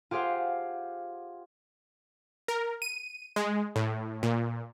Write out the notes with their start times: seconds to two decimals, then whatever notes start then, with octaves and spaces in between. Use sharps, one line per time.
0.11 F4 G4 G#4 C5 F5 F#5
2.48 A#4
2.82 D#7
3.36 G#3
3.76 A2
4.23 A#2